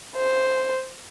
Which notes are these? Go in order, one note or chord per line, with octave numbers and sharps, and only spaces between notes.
C5